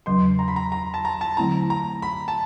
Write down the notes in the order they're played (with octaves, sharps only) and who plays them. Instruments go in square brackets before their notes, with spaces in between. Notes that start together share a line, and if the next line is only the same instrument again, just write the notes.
[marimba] E2 C#3 F#3 [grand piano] C6
[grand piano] A#5
B5
A#5
A#5
A5
A#5
A5
[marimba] D3 F#3 A3 C4 E4 [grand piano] A#5
[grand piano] A#5
B5
A5